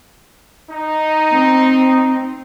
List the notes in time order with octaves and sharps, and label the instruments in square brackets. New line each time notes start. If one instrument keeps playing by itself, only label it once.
[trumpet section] D#4
[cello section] C4